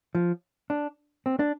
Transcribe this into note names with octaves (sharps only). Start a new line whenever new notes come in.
F3
D4
C4
D4